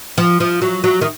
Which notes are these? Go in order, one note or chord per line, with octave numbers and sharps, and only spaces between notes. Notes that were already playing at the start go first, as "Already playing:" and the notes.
F3
F3
F#3
F#3
D#3